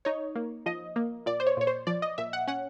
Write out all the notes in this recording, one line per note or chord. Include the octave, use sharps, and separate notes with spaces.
D#4 C#5
A#3
F3 D#5
A#3
A#2 D5
C5
C#5
A#2 C#5
C5
F3 D5
D#5
A#2 E5
F#5
C#4 F#5